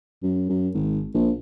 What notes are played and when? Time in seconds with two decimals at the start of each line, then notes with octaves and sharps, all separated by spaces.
0.23 F#2
0.49 F#2
0.74 G#1
1.14 A#1